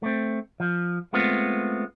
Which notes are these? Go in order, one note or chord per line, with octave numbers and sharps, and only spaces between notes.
A3 C4
F3
G#3 A3 B3 C4 F4